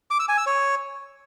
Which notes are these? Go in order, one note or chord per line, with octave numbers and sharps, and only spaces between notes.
D6
E6
G#5
E6
C#5